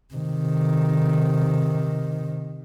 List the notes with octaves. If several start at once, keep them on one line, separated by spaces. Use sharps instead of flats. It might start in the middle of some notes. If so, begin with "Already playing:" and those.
C3 D#3